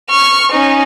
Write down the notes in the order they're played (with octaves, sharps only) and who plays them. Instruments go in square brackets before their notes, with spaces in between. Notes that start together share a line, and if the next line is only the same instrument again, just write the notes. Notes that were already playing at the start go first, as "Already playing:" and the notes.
[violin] C#6 F6
C#4 D#4